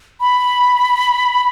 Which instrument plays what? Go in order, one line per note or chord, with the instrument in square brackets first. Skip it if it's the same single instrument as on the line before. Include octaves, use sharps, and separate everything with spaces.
[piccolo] B5